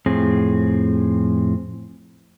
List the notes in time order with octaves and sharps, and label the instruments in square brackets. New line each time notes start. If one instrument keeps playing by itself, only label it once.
[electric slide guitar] F2 A2 C4 G#4